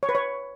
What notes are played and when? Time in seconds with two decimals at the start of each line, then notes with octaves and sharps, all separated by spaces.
0.03 C#5
0.09 B4
0.15 C#5